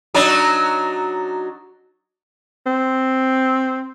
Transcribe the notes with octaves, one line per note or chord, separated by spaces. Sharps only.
F#3 D4 D#4
C4